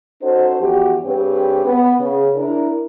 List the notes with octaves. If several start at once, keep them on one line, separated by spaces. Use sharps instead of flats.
C#4 D#4 F#4 A4 C5
E2 F3 F#4 G4
G2 C4 G4 G#4 B4 C#5
B3
C#3
D4 E4 A#4